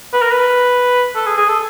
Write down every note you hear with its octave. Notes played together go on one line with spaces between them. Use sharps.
B4
A#4
B4
A4
G#4
G#4
A4